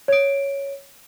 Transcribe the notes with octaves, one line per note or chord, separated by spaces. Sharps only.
C#5 D7